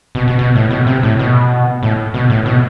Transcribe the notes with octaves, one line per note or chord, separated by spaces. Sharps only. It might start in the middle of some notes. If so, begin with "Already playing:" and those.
B2
B2
B2
A2
B2
C3
A2
B2
A2
B2
A2
B2